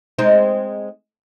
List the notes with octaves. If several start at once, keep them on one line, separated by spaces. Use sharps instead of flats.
G#3 C4 D#4